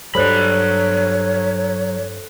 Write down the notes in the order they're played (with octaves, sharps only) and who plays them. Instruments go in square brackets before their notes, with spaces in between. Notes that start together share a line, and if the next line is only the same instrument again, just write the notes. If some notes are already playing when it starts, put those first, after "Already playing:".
[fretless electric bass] G2 G3 [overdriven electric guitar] F#3 B5 [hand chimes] A4 C5 F#6 [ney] C#5